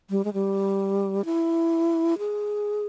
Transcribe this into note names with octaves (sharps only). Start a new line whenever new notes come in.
G3
G#3
G3
E4
G#4